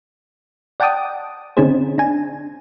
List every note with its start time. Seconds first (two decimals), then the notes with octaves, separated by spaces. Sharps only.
0.80 D5 F#5 G5 A5 D6 D#6
1.57 D3 C4 C#4 D#4 G#4 C5
1.98 D4 G#5